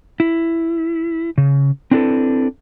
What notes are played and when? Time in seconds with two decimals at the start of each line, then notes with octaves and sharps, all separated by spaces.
0.20 E4
1.38 C#3
1.91 C4 D4 E4 G#4 A4 B4